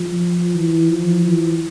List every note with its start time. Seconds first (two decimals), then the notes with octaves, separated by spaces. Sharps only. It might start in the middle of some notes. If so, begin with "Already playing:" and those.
Already playing: F3
0.54 E3
0.89 F3
1.26 E3